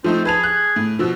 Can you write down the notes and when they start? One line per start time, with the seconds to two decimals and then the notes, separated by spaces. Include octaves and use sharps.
0.04 F3 A3 C4 D#4
0.25 G#4 B4 A5 F7
0.43 F#6
0.76 A2
0.99 B2 F3 E6